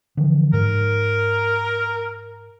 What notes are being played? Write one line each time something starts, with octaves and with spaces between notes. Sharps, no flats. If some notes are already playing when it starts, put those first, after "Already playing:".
D3 E3 F3
G#2 A#4